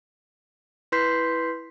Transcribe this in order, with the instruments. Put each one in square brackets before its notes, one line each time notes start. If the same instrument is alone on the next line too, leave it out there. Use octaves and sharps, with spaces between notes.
[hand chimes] E4 B4 C6 G6 B6 C7